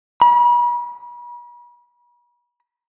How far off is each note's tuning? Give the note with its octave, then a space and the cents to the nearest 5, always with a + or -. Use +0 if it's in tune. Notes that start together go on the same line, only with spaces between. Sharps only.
B5 -40